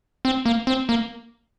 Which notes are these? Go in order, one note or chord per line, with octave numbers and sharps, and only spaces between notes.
C4
A#3
C4
A#3